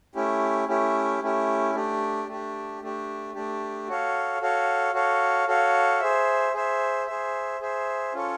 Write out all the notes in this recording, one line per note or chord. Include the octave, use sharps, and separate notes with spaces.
A3 C#4 E4 G4
A3 C#4 E4 G4
A3 C#4 E4 G4
A3 D4 G4
A3 D4 G4
A3 D4 G4
A3 D4 G4
F#4 A4 C#5 F5
F#4 A4 C#5 F5
F#4 A4 C#5 F5
F#4 A4 C#5 F5
G#4 C5 E5
G#4 C5 E5
G#4 C5 E5
G#4 C5 E5
C#4 F4 A4 C#5